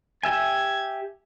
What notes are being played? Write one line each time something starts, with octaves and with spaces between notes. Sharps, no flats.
G4 E5 G#5 G#6